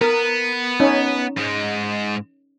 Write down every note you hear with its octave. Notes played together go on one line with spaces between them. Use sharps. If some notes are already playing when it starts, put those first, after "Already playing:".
B3 A#4
C#4 D#4
G#2 G#3